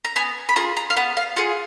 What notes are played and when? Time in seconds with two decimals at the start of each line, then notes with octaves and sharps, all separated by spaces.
0.05 A#5
0.16 B3 G#5
0.49 B5
0.56 F4 G#4 A#5
0.77 A#5
0.90 F5
0.97 B3 F#5
1.17 F5
1.36 F4 G#4 F#5